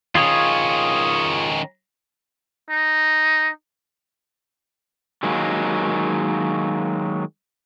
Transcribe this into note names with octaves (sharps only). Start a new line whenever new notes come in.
D#3 C#4 F4 G#4 C#5
D#4
D#3 F#3 G#3 A#3